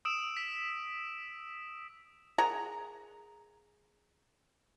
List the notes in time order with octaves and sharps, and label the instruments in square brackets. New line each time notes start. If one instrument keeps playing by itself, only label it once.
[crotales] D#6 E6 D7 E7
B6
[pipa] G#4 A#4 F#5 A#5